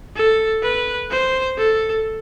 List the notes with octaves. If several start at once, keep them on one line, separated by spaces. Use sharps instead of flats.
A4
B4
C5
A4